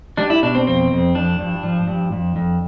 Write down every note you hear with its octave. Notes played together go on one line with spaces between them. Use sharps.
G3 D4
E4
B2 D4
C4
F2 C4
F2
F3 D4
G2
F3
G2
F2
F2